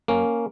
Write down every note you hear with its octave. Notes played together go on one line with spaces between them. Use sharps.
F#2 A#3 C#4